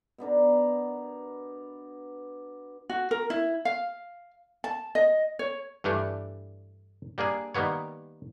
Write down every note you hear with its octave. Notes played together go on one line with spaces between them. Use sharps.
B2 B3 D4 A#4
F#4
A#4
E4
F5
A5
D#5
C#5
G2 E3 G3 A3 D4
G3 A#3 D4 G#4
D#3 G3 A#3 B3 C#5